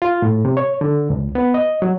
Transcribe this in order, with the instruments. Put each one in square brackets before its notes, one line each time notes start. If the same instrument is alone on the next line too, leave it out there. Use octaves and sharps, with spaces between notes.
[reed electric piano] F4
A2
C3
C#5
D3
C#2
B3
D#5
F#3